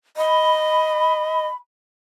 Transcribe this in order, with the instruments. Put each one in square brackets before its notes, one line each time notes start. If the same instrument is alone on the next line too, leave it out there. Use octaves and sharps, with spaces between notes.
[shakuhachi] D#5 [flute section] B5